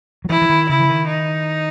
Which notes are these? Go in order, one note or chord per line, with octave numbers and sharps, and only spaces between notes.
F#3
E3 E4
E3
D#3
C#3 E4
E3
D#3
D#4